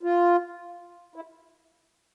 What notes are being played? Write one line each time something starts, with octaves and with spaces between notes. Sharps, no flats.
F4
E4